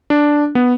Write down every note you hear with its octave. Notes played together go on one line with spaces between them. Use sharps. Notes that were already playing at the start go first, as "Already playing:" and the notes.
D4
B3